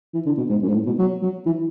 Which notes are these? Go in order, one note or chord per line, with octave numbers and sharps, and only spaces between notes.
E3
D3
B2
G#2
F#2
G#2
A2
B2
F#3
F#3
E3